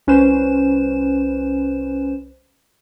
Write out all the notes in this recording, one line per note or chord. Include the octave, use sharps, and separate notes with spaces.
C2 C#4 B4 C5 E7